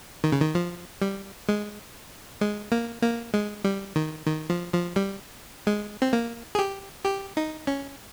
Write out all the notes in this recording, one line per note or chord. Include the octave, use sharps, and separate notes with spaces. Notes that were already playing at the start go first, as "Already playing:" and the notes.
D#3
C#3
D#3
F3
G3
G#3
G#3
A#3
A#3
G#3
G3
D#3
D#3
F3
F3
G3
G#3
C4
A#3
G#4
G4
G4
D#4
C#4